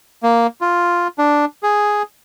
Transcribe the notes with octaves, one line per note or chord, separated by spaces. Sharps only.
A#3
F4
D4
G#4